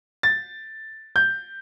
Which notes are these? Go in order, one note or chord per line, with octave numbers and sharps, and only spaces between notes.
A6
G6